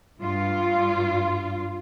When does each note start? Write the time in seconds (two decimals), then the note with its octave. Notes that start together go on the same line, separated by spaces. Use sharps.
0.21 G2 F4